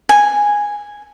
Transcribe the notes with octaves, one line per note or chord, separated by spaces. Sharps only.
G#5